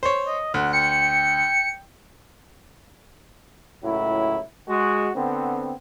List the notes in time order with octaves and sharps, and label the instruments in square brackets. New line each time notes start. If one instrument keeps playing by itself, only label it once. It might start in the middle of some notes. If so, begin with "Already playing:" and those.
[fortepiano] C5 C#5
[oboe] D#5
[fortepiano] D2 [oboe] F#5
[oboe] G5 [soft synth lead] C#7
[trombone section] C#2 A2 F#3 E4
G#3 F#4
D3 B3 C4